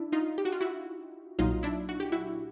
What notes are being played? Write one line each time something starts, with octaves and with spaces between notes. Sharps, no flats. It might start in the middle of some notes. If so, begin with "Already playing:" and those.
Already playing: D4 E4
D#4 F4
G4
F#4
F4
E4 F#4
B1 A#2 F#3 D#4 F4
D4 E4
F#4
G4
E4 F#4